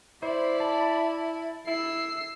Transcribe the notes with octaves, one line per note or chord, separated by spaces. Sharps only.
E4 C5 D5 B5
A5
E4 E6 C7